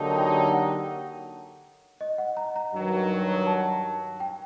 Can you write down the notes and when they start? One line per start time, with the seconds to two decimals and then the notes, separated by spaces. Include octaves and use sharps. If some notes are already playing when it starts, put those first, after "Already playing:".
Already playing: D3 F#3 A#3 D#4 G4 A5
0.10 A5
0.16 G5
0.53 F#5
2.01 D#5
2.18 F#5
2.37 A#5
2.56 A#5
2.74 G2 D#3 F#3
3.46 A5
4.20 G5